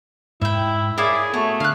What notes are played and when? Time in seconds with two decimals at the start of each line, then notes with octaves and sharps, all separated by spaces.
0.42 G#2 E4 E5 G5
0.98 E4 G#4 A#4 C#5 D5 F5
1.34 A3 B3 F#4 C#5
1.60 D3 F5 F#6